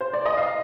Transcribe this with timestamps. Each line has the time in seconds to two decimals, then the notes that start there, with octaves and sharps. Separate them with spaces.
0.01 C5
0.13 D5
0.26 D#5
0.37 F5